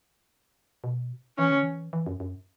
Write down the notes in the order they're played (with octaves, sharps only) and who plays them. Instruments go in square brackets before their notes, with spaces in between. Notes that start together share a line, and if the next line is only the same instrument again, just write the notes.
[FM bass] B2
[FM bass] E3 [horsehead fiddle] C#4
[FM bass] D3
E3
E3
F#2
F#2